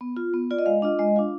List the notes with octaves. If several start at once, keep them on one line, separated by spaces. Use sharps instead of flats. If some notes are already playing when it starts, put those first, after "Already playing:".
B3
F4
B3
F4 D5
D#5
G#3 F5
D4 F4 D#5
G#3 D#5
D4 F4 F5